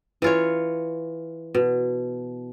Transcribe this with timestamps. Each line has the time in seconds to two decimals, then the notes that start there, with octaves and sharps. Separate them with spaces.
0.22 E3 F4 C#5
1.55 B2